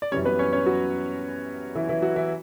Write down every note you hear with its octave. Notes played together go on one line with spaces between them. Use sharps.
D5
F#2 E3 G3 C#4 C#5
B3 B4
C#4 C#5
C#4 C#5
F#3 F#4
E3 E4
E3 E4
F#3 F#4
E3 E4